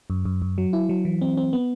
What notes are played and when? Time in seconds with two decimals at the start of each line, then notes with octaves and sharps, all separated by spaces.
0.10 F#2
0.25 F#2
0.42 F#2
0.58 F#3
0.73 E4
0.89 F#3
1.05 E3
1.21 C4
1.37 C4
1.53 B3